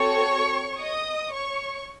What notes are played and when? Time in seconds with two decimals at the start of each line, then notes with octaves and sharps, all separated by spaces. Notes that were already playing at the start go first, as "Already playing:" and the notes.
Already playing: C4 F#4 A4 C#5 C#6
0.78 D#5 D#6
1.31 C#5 C#6